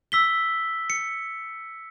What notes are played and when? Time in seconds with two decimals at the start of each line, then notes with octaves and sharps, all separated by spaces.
0.12 E6 B6 G7
0.90 C#7